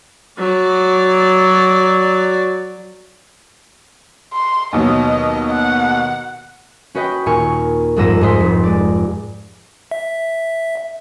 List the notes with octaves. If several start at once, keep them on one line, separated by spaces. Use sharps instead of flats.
F#3 D5
C6
D#2 B2 F#3 D#5
F#5
C#4 F#4 B4 D#5 G5
D#2 A#2 G#5 C#6 F6
C2 F2 G#2 E6 A#6 D#7
G#2 G#4 C5 D#5 C6 B6
F1 G#2
G#3 D5
E5